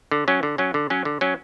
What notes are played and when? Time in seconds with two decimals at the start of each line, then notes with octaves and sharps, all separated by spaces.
0.11 D3
0.28 F#3 C#4
0.43 D3
0.58 F#3 C#4
0.74 D3
0.90 F#3 C#4
1.05 D3
1.21 F#3 C#4